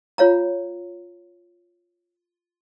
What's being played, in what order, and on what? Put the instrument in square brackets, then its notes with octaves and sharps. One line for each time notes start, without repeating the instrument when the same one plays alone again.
[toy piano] F4 C#5 F5 A#5